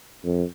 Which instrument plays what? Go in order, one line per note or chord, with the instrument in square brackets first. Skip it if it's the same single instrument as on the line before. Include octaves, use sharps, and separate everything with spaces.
[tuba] F2